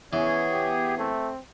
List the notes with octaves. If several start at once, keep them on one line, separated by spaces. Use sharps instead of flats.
E3 B3 C#4 G#4 C#5
G4
A3 C4